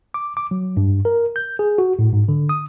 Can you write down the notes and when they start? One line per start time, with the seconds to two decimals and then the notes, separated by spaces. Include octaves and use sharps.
0.14 D6
0.37 D6
0.51 F#3
0.77 G2
1.05 A#4
1.36 G6
1.59 G#4
1.78 F#4
1.99 A2
2.13 G#2
2.28 D3
2.49 D#6